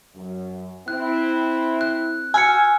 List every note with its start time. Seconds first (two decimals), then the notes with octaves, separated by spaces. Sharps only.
0.14 F#2
0.88 C4 E4 F#6
1.81 F#6
2.34 F#4 G#5 E6 F6 C#7